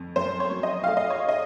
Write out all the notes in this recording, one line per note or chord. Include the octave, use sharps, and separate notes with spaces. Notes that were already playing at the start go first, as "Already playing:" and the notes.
Already playing: F2
F#2 C5
C#5
F#3
D#5
A3 F5
D#5
C#5
D#5